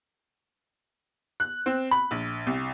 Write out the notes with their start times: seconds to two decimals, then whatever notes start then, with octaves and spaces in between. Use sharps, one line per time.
1.40 F#6
1.66 C4
1.91 B5
2.11 A#1
2.47 C2